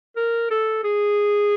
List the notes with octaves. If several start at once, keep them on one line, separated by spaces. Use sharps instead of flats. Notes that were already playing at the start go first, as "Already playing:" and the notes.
A#4
A4
G#4